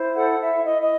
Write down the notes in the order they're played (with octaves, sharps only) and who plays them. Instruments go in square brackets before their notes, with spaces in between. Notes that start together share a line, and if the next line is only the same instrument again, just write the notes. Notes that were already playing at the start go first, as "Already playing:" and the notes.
Already playing: [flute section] E4 C5
A4 F#5
E4 E5
E4 D#5
D#5